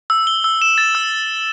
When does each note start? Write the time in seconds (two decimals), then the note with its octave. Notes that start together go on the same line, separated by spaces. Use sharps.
0.10 E6
0.27 G7
0.44 E6
0.62 E7
0.78 A6
0.95 E6